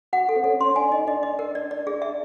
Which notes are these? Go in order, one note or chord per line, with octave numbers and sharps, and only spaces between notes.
F#4 F#5
A4
C4
C#4 A4
C#4 C6
D4 G#5
D#4 D#5
D4 D#5
D#5
A#4
D5
D5
G#4
E5